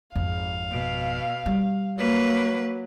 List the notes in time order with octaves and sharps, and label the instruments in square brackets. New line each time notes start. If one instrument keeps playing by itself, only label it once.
[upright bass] G#1 F2 [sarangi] F5
[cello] B2
[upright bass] G3
[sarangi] F#3 [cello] A#3 B4